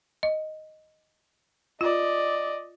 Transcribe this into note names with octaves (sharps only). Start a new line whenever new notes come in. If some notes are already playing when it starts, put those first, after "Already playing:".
D#5
F4 D5 D#5